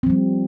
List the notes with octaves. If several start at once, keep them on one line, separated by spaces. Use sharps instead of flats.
F3 G3 C4